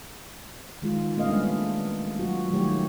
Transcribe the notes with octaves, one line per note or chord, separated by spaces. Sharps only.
D#3 G#3 F4
A3 B3 C#4 D#5 F5
G3 G#3 A#3 D4
F#3 F4 F#4
D#3 F#3 G3 A3 G4 C#5